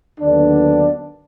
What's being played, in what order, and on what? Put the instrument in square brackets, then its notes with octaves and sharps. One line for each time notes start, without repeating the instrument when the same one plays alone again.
[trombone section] D#2 D3 F#3 B3 D4